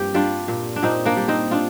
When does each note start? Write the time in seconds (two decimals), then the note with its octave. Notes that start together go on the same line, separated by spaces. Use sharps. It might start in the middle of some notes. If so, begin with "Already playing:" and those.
Already playing: G2 F3 A#3 C4 G4
0.14 G3 D4 F4
0.48 A#2
0.76 D4
0.83 A#2 C4 D#4
1.05 A#3 D4
1.17 G3
1.28 C4 D#4
1.51 D4 F4